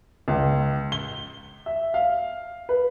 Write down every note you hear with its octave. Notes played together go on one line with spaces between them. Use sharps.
C#2
G7
E5
F5
B4